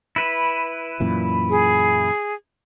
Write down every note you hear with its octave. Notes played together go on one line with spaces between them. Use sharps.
E4 B4
F#2 A#2 E3
G#4